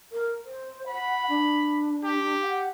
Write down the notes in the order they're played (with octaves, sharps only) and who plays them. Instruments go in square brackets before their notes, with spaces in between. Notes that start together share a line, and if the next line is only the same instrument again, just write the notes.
[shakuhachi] A#4
C5
[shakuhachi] F#5 [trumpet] B5
[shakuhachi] D4
[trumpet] G4
[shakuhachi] F#5